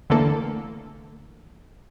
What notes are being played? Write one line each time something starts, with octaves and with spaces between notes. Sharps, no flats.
D3 E3 A3 A#3 A4